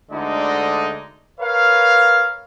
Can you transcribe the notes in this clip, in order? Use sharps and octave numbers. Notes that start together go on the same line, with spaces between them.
D2 D3 G#3 D#4 D5 D#5
A#4 B4 C#5 F5